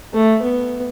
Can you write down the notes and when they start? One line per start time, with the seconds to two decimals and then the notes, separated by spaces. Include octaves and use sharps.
0.13 A3
0.42 B3